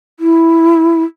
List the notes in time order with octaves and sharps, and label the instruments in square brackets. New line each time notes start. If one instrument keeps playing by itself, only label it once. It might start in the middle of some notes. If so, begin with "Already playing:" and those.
[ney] E4